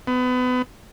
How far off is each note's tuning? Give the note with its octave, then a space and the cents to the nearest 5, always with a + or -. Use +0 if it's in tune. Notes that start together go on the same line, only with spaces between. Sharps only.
B3 +30